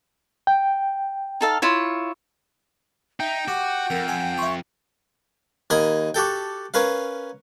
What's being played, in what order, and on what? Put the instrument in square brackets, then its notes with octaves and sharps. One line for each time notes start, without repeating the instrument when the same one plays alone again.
[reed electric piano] G5
[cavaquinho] D#4 A4 F5
E4 F4 C#5
[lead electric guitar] D#4 [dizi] E5 [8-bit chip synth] G5
[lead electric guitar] F#4 [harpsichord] G4 [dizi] F#5
[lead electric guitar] F2 [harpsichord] A#4
[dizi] F#5 [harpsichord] G#5
[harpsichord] E5 C6 [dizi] C#6
[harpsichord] D#2 A#4 D#5 G#5 B5
F#4 G4 A4 G5
C#4 A#4 B4 F5